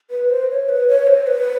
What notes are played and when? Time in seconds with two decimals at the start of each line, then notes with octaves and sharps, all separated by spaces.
0.11 B4
0.30 C5
0.50 C#5
0.69 B4
0.88 C#5
1.07 C5
1.27 B4